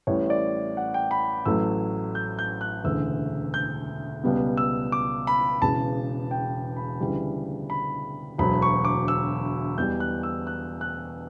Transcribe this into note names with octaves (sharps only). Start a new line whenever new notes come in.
A1 A2 G3 C#5
D5
F#5
G5
B5
A1 A2 F#3 A3 E6
G6
G6
F#6
E1 D2 C#3 E3 A3 E6
G6
C#2 B2 G3 B3
E6
D6
B5
E1 E2 C#3 A5
G5
B5
D2 C#3 E3 G3
B5
E1 D2 D3 F#3 B5
C#6
D6
E6
E2 B2 G3 G6
F#6
E6
F#6
F#6